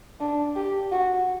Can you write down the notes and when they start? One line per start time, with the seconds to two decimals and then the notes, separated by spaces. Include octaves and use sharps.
0.20 D4
0.56 G4
0.92 F#4